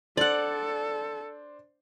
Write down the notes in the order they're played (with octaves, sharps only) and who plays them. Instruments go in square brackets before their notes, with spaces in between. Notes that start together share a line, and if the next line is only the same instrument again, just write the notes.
[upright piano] D4 C5 [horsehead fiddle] A4 [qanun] D5 F#5